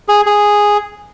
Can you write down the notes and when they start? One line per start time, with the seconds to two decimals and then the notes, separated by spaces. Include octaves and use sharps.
0.08 G#4
0.26 G#4